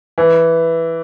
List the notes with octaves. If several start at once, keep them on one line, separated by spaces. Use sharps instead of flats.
E3